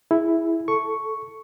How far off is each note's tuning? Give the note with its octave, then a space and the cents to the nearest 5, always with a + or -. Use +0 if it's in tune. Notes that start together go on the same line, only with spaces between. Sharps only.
E4 +0 G#4 +0
A4 +0 C#6 +0